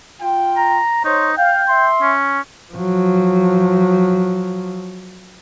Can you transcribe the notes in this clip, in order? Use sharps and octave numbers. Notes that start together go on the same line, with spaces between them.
F4 G5
A#5
D#4 C5 C#5
F5 G5
E5 C6
C#4
F3 F#3